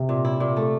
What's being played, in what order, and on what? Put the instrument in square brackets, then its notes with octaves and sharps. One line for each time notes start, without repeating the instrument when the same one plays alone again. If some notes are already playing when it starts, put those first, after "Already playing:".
Already playing: [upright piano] C3
[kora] A#2
E4
A#2
A3